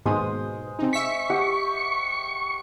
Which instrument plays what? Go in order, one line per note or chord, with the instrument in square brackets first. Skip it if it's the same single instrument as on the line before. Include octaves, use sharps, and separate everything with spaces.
[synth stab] D#2 G#2 B2 [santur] G#3 C5 D#6
[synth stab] C3 D#4
[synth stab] E5 B6 [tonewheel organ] C#6
[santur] G4 F#5 D#6